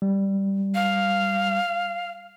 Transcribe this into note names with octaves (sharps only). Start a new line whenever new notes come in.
G3
F5